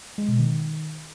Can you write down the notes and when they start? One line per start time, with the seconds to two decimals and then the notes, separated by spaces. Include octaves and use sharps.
0.18 G#3
0.28 B2
0.39 D#3